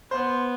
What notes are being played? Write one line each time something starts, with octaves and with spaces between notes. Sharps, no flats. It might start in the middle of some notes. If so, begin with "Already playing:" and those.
B3 C5